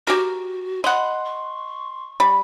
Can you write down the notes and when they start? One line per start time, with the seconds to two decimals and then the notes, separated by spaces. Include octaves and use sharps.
0.07 F#4 G4 A#4
0.84 D#5 F#5 B5 C6
1.25 C#6
2.20 G3 B5